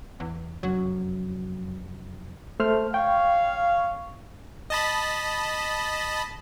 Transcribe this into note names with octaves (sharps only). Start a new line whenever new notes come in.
E2
F1 F#2 F#3
A3 C5 F6
C#5 F5 G5
D#5 A5 B5